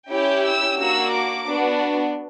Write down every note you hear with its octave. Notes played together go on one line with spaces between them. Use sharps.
C#4 E4 G4 G5
E6
A#3 D4 F#4 E6
D6
B3 D4 F#4